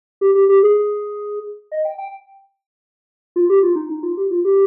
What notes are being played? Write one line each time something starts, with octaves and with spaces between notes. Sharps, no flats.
G4
G4
G4
G#4
D#5
G5
G5
F4
G4
F4
D#4
D#4
F4
G4
F4
G4